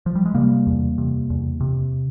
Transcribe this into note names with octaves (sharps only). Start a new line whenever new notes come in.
F3
G3
G#3
C3 G3 A#3
E2
C3
E2
C3